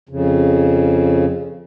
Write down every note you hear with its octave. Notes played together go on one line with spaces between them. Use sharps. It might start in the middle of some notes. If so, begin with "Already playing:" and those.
F2 C#3